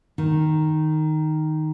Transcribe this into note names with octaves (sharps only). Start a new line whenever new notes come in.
D#3